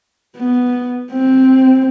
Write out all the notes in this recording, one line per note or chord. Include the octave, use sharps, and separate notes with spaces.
B3
C4